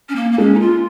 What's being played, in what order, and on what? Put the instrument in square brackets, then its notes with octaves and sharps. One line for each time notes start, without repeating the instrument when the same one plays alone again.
[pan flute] C#4
A#3
A#3
[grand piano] G#3 [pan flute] C#4
[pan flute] D#4
F4